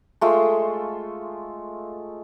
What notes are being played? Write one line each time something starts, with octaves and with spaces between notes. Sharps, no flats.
G#3 A3 F4